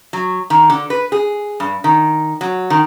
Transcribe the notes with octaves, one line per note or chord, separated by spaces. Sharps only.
F#3
D#3
D3
B4
G#4
G2
D#3
F#3
D#3